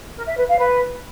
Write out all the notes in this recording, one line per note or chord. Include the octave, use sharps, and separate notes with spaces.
A#4
E5
B4
F5
B4